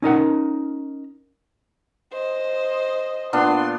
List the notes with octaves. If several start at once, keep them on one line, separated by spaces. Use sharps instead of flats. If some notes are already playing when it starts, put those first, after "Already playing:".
C#4 D#4 A#4 F#5
C5 D#5
A#2 B3 D4 C6